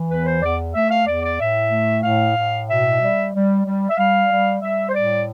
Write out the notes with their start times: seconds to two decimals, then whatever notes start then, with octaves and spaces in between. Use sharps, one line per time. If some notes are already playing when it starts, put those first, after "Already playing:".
Already playing: E3
0.09 E2 B4
0.25 C5
0.42 E2 D5
0.74 A3 E5
0.90 F5
1.06 E2 D5
1.23 D5
1.38 A2 E5
1.70 A3
2.03 A2 F5
2.36 A2
2.68 B2 E5
3.00 G3
3.33 G3
3.65 G3
3.90 E5
3.97 G3 F5
4.29 G3
4.61 G3 E5
4.88 C5
4.93 A2 D5